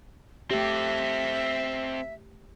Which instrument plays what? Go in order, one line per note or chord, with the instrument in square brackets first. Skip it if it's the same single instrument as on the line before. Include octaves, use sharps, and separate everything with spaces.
[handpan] A3 G4 [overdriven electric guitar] C4 A4 [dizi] E5